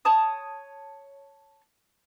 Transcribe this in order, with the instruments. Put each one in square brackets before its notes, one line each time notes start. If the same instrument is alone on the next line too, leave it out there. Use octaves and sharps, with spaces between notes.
[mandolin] C#5 A5 D#6